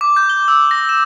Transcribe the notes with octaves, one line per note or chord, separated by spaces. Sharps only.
D6
G6
G7
E6
A#6
E7